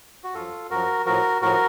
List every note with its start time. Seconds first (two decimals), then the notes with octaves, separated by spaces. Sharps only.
0.24 F#4
0.34 F#2 F3 F4 A4
0.70 F#2 F3 F#4 A#4
1.06 A2 F3 F#4 A#4
1.42 A2 F3 F#4 A#4